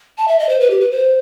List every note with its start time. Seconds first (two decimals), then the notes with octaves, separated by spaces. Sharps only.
0.18 A5
0.28 E5
0.39 D#5
0.49 C5
0.60 B4
0.70 G4
0.80 B4
0.91 C5